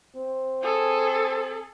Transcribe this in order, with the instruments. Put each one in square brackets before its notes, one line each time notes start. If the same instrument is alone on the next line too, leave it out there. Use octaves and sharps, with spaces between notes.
[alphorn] C4
[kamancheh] G#4 A4